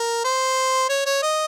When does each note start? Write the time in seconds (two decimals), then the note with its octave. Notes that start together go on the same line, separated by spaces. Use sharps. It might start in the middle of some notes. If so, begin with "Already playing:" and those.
Already playing: A#4
0.24 C5
0.89 C#5
1.06 C#5
1.23 D#5